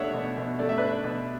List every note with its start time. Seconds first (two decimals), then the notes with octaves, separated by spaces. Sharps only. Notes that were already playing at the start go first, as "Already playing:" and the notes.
Already playing: B2 A3 D4 C#5 E5 F#5
0.14 B2
0.37 B2
0.59 A3 D5
0.69 E5
0.78 D4 B4 D5
1.04 B2